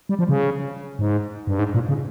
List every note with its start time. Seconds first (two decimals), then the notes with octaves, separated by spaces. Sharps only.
0.09 G3
0.19 F3
0.29 C#3
0.99 G#2
1.47 G2
1.59 G#2
1.74 A#2
1.89 C#3